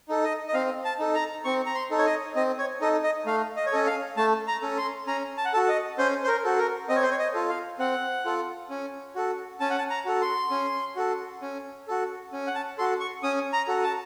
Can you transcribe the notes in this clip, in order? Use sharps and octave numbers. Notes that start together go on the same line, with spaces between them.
D#4 A4
D#5
D#5
C4 F5
A5
D#4 A4
A#5
C4 C#6
A#5
C6
D#4 A4
C#5
D#5
C4 D#5
C#5
D#4 A4 D#5
D#5
A3 F5
D#5
C#5
C#4 A4 D#5
F5
A3 A5
A#5
C#4 A4
C6
C#4 A#5
A5
F#5
F#4 A4 A5
D#5
C#4 C5
C5
A#4
F#4 A4
A#4
C4 D#5
C#5
C5
C#5
D#5
F4 A4
F5
C4 F#5
F4 A4
C#4
F#4 A4
C#4 A5
F#5
A5
A#5
F#4 A4
C6
C#4
F#4 A4
C#4
F#4 A4
C#4
F#5
A5
F#4 A4 C6
C#6
C#4 D#6
A#5
F#4 A4
A5